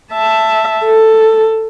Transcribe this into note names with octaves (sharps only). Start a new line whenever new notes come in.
E5 A5
A4